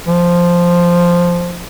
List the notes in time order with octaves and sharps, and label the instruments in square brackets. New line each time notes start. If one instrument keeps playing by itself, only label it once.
[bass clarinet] F3